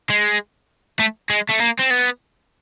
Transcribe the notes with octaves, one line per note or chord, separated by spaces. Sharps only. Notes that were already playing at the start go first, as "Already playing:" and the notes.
G#3
A3
G#3
A3
A#3
C4
B3